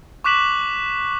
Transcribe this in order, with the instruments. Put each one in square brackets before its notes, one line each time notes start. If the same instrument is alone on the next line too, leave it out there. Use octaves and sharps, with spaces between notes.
[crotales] C#6 D6 F#6 B6 E7 F#7